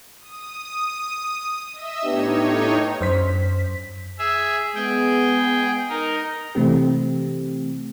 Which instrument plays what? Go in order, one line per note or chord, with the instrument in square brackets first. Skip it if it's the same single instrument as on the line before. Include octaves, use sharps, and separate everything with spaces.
[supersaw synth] D#6
D#5 E5 E6
[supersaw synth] A2 D#4 C#5 [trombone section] B3 D4 G4
[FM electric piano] F#2 C5 B6
[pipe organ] G#4 E5
[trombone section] G#3 B3 [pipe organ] G#4 G5
[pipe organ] D#4 A#4
[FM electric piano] C3 E3 A3 C4 G4